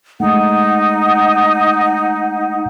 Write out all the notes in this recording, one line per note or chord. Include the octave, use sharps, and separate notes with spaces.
G#3 A3 D#4 F#5